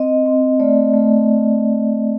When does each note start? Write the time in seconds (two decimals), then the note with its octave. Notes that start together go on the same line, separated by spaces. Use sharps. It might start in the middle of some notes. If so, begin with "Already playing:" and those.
Already playing: C4 D#5
0.26 C4
0.60 A3 D5
0.94 A3